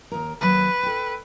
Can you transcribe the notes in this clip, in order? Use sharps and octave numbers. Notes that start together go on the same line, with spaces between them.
D#2 A#4
D#2 F#3 B4
A4 G5